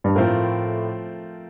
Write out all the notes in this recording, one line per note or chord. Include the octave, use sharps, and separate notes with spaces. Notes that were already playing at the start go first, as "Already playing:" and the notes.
G2
A2 F3 A3 C4 F4 A#4